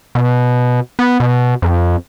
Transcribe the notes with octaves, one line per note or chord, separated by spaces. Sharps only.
B2
B3
B2
F2